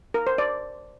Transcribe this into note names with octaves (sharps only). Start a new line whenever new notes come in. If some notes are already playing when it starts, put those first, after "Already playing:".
A#4
C5
D5